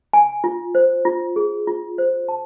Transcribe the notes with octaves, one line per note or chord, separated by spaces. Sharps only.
G#5
F4
C5
F4
G#4
F4
C5
A5